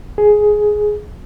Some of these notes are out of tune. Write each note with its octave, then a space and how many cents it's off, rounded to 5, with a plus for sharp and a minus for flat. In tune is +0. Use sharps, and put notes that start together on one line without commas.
G#4 +10